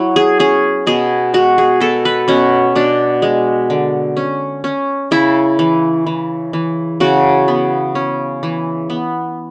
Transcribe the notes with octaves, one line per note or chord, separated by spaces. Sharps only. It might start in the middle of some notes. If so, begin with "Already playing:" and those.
Already playing: F#3 E4
G#4
C#4 G#4
B2 G#4
G#3 F#4
G#4
B2 A4
B4
B2 C#4
B2 D4
G#3
D3
C#4
C#4
C#3 E4
E3
E3
E3
C#3 F#4
B3
C#4
E3
B3